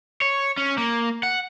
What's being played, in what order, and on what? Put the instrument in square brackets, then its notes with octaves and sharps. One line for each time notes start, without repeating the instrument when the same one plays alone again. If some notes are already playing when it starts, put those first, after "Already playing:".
[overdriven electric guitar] C#5
C#4
A#3
F#5